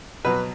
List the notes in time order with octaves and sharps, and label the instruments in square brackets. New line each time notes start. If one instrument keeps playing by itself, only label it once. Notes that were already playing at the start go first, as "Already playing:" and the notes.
[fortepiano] B2 F#3 B4